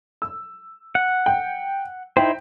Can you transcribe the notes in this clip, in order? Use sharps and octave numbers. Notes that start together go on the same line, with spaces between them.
E6
F#5
G5
D#4 E4 C5 G5